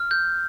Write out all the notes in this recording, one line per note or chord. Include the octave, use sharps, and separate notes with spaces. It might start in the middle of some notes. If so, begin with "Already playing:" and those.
Already playing: F6
G6